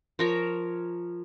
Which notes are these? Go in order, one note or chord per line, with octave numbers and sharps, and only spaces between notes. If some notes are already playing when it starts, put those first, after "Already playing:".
F3 A#4 C#5